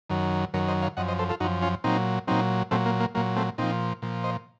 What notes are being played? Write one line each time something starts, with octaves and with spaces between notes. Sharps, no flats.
F#2 D#3 F#3
F#2 D#3 F#3 A#4 C#5
C5 D#5
C#5 F5
F#2 F3 D#5 F#5
C5 D#5
A4 C5
F4 A4
F#2 F3 D#4 F#4
C#4 F4
A#2 F#3 C4 D#4
A#2 F#3 C4 D#4
A#2 F#3 A3 C4
A#3
A#3
A#2 F#3 A#3
A3 C4
A#2 F3 C4 D#4
A#2 F3
C5 D#5